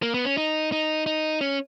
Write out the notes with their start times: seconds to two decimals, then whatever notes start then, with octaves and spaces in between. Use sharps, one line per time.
0.02 A#3
0.14 B3
0.25 C#4
0.37 D#4
0.72 D#4
1.06 D#4
1.41 C#4